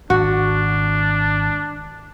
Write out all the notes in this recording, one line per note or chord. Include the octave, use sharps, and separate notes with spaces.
G#1 D4 F#4